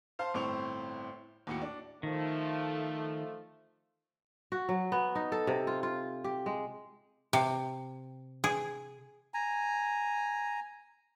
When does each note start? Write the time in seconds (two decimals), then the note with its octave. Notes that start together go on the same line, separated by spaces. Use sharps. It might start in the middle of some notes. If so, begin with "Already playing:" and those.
0.19 C5 F5 A5 C6
0.34 G1 A2 C4 C5 C#6 F7
1.47 D#2 A2 F#4 G5 C#7
1.62 D4
2.03 D#3 F3 A3
4.52 F#4
4.69 F#3
4.92 B3
5.15 D#4
5.32 A4
5.47 C3
5.67 F4
5.83 F4
6.24 G4
6.46 G#3
7.33 C3
8.44 G#4
9.34 G#5 A#5